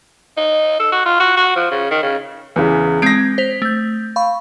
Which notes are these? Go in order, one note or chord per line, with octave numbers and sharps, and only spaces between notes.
D#4
A4
F#4
F4
F#4
F#4
F3
C#3
D#3
C#3
E2 C#3
G#3 C4 G#6 A#6 D7
C5 B6 F7
A3 G6
F5 B5 C#6